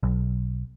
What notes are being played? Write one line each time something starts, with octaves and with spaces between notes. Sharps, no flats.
B1